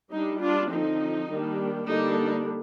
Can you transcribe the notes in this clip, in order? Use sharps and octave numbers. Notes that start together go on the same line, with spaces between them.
G3 D4 D#4
D4 F4
D3 F3 C4 D#4
D#3 G3 A#3 D4
D3 G3 A#3 D4 D#4